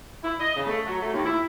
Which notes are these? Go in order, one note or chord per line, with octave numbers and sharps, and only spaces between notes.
E4
D#5
C#3
A3
F#3
A3
D#2
E4